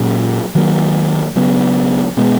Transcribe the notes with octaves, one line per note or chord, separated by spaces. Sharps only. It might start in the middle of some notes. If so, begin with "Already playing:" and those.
Already playing: A#2 F#3 C#4
D#3 F#3 A#3
C#3 F#3 B3
B2 G#3 B3